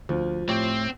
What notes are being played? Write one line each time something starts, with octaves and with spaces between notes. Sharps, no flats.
D2 F3
A2 C4 G4 C#5